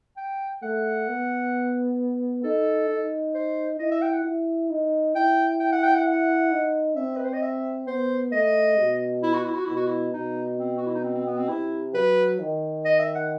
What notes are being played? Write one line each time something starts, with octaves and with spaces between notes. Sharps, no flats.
G5
A3 F#5
B3
D#4 A4
D#4
C5
E4 D#5
E5
G5
F#5
E4
D#4
E4 G5
G5
F#5
G5
F#5
F#5
D#4
C4 E5
B4
C5
D#5
E5
B3 C5
A3 D#5
B2
E4
F#4
E4
F#4
B2 E4
F#4
E4
B2 D#4
C4
F#4
E4
D#4
C4
C4
B3
C4
C3 E4
F#3 B4
D#3
D#5
E5
F#5